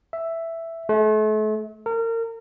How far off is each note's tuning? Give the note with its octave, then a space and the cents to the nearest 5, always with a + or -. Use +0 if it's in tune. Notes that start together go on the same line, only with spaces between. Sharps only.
E5 +5
A3 -40
A#4 -30